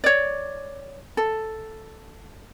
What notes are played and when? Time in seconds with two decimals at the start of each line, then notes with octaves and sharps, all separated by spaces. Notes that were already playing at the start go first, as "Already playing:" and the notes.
0.04 C#5 D5
1.17 A4